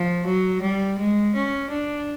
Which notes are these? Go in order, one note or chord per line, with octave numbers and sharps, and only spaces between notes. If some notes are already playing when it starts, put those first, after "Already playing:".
Already playing: F3
F#3
G3
G#3
C#4
D4